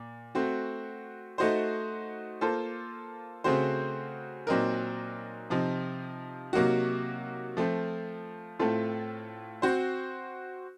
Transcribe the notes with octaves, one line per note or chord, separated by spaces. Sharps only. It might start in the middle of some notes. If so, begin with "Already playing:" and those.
Already playing: A#2
A3 C4 F#4
A3 D#4 F#4 C5
A#3 F4 A4 C5
C#3 A3 C4 F#4 C5
A#2 F#3 C4 D#4 A#4
C3 F3 C4 D#4
C3 F#3 A#3 D#4 F#4
F3 A3 C4
A2 A3 C4 F4 A4
C4 F#4 C5